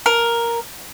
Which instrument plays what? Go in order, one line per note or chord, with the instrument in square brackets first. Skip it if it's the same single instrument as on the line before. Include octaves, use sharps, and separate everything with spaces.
[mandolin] A#4